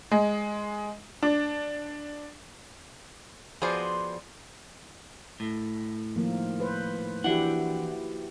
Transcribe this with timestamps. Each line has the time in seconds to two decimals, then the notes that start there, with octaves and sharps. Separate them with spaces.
0.11 G#3
1.23 D4
3.62 F3 B3 F#4 G#4 C5 D5
5.40 A2
6.16 D#3 F3 A#3
6.60 B4 C5
7.24 E3 D4 E4 F#4 G4 F#5